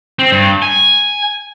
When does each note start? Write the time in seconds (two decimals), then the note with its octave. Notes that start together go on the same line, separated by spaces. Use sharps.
0.19 C4
0.32 G2
0.62 G#5